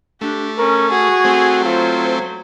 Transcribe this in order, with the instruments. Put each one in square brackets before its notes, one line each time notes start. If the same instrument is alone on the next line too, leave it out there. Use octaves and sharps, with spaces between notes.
[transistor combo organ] A3 [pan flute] D4 [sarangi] G4
[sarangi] C#4 [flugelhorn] A#4 [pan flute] C#6
[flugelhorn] F#4 [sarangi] G#4
[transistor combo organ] A3 C4
[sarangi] F#3 [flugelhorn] F4 [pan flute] C5